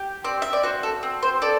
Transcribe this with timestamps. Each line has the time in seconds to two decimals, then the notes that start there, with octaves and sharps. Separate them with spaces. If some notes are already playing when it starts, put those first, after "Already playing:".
Already playing: G4
0.24 C4 D5
0.42 E5
0.53 D5
0.63 F#4 C5
0.83 A4
1.03 C4
1.22 C5
1.42 A4 D5